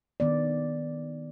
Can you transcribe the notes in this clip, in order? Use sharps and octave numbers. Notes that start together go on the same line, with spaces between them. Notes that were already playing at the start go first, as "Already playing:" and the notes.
D#3 B3 D5